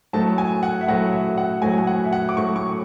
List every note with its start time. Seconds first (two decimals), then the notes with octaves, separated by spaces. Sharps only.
0.13 A2 F#3 A3 A5
0.38 G#5
0.63 F#5
0.81 E5
0.88 A2 F#3 A3 F#5
1.13 E5
1.38 F#5
1.62 A2 F#3 A3 G#5
1.78 G#5
1.87 F#5
2.04 E5
2.13 F#5
2.29 D6
2.37 A2 F#3 A3 C#6
2.56 C#6